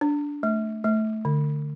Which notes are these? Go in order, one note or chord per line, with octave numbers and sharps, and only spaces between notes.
D4
A3
A3
D3